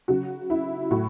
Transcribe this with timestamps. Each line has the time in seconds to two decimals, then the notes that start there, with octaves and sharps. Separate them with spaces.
0.08 C#3 F#3 F#4
0.50 E4
0.91 A2 F#3 F#4